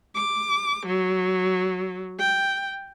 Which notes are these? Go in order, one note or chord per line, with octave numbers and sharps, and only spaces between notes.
D6
F#3
G5